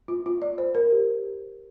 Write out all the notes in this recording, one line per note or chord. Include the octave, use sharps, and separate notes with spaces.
F4
F4
D5
C5
A#4
G4